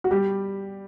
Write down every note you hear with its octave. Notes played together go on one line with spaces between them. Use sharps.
F#4
G3 G4